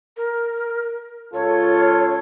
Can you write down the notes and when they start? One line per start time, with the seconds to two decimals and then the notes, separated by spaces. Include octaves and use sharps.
0.17 A#4
1.34 C#2 F4 A4 C#5